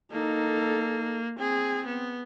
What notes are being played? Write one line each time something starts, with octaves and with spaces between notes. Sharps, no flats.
A#3 D#4 A4
C4 G#4
B3